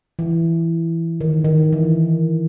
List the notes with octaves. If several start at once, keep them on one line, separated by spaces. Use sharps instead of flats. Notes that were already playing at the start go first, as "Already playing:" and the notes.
E3
D#3
D#3
E3